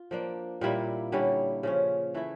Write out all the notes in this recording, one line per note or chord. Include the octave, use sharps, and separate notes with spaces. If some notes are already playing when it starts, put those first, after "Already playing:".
Already playing: F4
F3 A#3 D4
A#2 G3 A#3 E4
D3 G3 C#4 E4
C#3 F3 C#4
E3 A3 E4